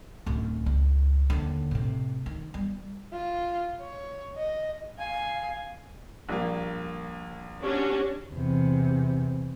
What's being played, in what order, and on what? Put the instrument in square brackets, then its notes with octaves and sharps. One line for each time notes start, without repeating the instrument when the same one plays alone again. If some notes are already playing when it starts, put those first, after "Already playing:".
[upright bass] D1 F#2
C#2
D#2 D3
A2 C3
D#3
G3 B3
[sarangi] F4
C#5
D#5
[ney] F5 [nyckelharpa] G#5
[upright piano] A#1 G3 A#3
[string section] C#4 D4 F#4 [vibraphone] G4
[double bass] E2 C3